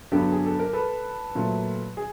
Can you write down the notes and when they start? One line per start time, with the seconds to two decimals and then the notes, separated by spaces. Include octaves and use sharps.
0.12 G2 D3 F#3 B3 G4 A4
0.32 G#4
0.46 A4
0.59 A#4
0.73 A4 B4
1.35 A#2 F#3 A3
1.97 G#4